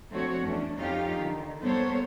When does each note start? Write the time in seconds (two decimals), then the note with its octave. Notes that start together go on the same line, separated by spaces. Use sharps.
0.10 F3 A3 C4 D4 F#4 C#5
0.42 E2 A3 C#4 D4
0.76 F2 C#4 D#4 F4 G4 F5
1.15 D3 D#3
1.61 G3 A#3 B3 A4 C5 C#5